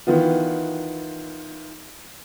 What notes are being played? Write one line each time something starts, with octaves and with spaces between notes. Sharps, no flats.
D#3 E3 B3 F4